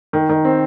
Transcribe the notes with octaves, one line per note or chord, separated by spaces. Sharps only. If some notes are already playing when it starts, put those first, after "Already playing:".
D#3
D#3
C4